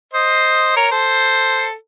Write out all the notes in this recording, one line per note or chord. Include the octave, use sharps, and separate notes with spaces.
C5 D#5
A#4 C#5
A4 C5